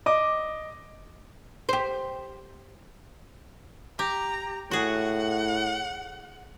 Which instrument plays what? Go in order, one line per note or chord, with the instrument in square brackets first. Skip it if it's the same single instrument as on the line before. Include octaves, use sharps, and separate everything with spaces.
[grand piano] D#5 D6
[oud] G4 C5
[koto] G4 [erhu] A#5
[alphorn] A2 [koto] F#4 G#4 [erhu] F#5